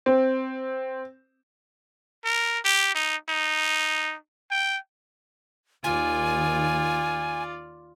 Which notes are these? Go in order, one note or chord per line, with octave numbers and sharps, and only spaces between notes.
C4
A#4
G4
D#4
D#4
G5
D#2 D#3 F4 D5 G#5